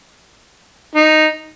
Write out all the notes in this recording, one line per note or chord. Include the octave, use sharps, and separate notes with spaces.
D#4